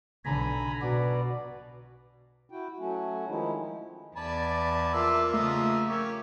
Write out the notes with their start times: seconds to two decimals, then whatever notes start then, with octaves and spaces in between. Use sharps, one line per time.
0.25 B1 D3 G#5 A#5 B5
0.82 B2 F#4 B4 D5
2.50 E4 F#4 G5
2.79 F#3 A3 C#4 F#4
3.28 D#3 F3 G#3 C#4 D#4 E4
4.16 E2 D5 G#5 A5 B5
4.94 F3 A#3 F4 E5
5.34 C#3 F3 A3 A#3 D#5 E5
5.88 A#3 C#4 G4